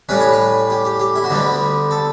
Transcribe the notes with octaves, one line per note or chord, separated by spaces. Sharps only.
A2 G3 C#4 B4
C#5
B4
G4
G4
G4
E4
F#4
D2 D3 G3 B3 G4
A4